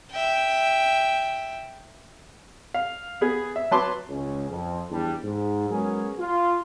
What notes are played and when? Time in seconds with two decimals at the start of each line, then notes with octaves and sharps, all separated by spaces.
0.11 E5 G5
2.74 F5
3.21 B3 G#4
3.56 E5
3.71 F#3 B4 A5 C6 D6
4.09 C#2 C#4
4.50 F2
4.90 E2 G3 D4
5.23 G#2
5.71 F#3 G#3 B3 C#4 G#4 A#4
6.19 F4